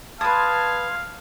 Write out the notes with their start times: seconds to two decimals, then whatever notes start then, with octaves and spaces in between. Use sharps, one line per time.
0.21 B4 F5 A5 C6 D#6 G#6